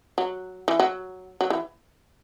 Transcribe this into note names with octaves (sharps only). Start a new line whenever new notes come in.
F#3
E3
F#3
F#3
E3